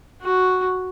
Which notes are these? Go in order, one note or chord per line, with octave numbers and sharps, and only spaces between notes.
F#4